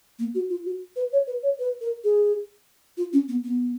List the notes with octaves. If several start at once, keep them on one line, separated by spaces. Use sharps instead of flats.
A#3
F#4
F4
F#4
B4
C#5
B4
C#5
B4
A#4
G#4
F4
C#4
B3
B3